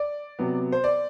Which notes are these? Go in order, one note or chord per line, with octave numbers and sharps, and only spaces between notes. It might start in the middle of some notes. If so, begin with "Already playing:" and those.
Already playing: D5
C3 F#3 B3
C5
D5